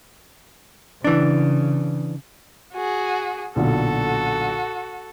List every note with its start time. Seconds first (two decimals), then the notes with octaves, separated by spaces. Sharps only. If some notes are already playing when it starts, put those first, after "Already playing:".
1.04 C#3 E3 D4
2.73 F#4 G#4
3.56 B1 A#2 D3 F#4 A4